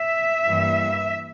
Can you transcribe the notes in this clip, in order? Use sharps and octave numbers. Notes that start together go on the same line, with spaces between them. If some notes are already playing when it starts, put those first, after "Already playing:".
Already playing: E5
G2 E3 G3 A#3